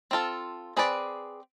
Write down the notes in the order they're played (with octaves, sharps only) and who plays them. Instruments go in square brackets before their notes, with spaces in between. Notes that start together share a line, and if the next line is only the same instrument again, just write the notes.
[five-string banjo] C4 F4 A4
C4 G#4 B4 D5